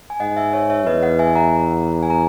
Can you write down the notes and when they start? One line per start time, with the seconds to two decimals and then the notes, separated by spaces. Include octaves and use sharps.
0.10 G#5
0.20 G#2 D#5 F#5
0.37 E5 G#5
0.53 C#5 E5
0.70 C#5 E5
0.86 E2 B4 D#5
1.03 D#5 F#5
1.19 E5 G#5
1.35 F#5 A#5
2.03 G#5
2.10 A#5